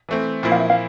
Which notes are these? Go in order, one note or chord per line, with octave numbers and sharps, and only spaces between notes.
E3 A3 C4
A#2 F3 A#3 E4
F5
E5
F5